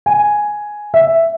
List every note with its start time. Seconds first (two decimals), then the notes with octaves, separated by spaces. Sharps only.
0.06 G#5
0.94 E5